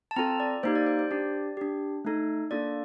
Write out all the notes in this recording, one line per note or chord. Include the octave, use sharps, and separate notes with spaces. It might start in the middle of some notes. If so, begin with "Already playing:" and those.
A5
C4 F4 A4 A#5
D5
A#3 D#4 G4 C5
D5
C5
C5
D4 G4 D5
D4 G4
A3 D#4 A4
A#3 D4 F4 A4 D5